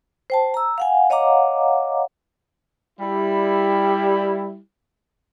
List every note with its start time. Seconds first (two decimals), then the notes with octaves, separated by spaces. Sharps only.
0.30 C5 G5 A5
0.54 A#5 E6
0.78 F5 F#5 G#5
1.10 C#5 D#5 F5 F#5 A#5 D6
2.99 G3 E4